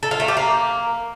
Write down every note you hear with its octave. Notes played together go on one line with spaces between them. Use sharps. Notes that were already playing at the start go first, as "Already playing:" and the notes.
A4
F4
A3
G4
A#3